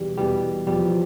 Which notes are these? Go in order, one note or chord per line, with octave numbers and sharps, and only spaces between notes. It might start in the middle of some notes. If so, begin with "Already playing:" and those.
Already playing: E2 B2 G3
E2 B2 G3
E2 B2 F3 G3